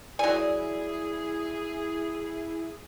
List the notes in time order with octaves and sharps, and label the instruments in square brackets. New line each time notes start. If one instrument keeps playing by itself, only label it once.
[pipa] F#3 G#5 [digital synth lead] E4 [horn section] G#4 [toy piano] D5